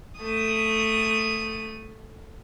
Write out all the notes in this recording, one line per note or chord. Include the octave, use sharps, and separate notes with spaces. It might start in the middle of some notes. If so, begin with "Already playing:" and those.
A3 D#6